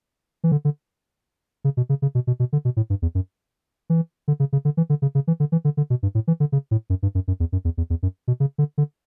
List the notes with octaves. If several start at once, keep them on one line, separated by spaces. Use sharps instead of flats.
E3
D3
D3
C#3
B2
C#3
C#3
B2
B2
B2
D3
B2
A2
G2
E2
F#2
E3
D3
C#3
C#3
D3
E3
D3
C#3
C#3
E3
D3
E3
D3
D3
B2
G2
A2
E3
D3
C#3
A2
F#2
G2
F#2
F#2
E2
F#2
E2
E2
E2
F#2
B2
C#3
D3
D3